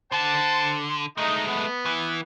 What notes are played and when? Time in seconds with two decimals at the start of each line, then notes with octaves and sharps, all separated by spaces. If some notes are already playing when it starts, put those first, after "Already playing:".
0.12 D3 C5 F#5 A5
1.18 G#3 A3 D#4
1.48 B3
1.86 E3